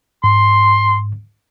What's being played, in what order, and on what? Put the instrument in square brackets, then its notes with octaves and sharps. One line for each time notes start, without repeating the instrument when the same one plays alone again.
[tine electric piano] G#2 [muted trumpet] C6